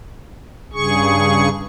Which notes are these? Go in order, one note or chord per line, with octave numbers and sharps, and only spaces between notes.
G2 C#3 G#4 C#6